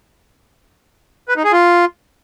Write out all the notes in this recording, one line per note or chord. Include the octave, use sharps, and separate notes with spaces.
B4
D#4
G#4
F4